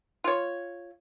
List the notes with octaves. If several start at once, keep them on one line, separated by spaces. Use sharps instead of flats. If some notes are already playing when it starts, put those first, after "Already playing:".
F4 C#5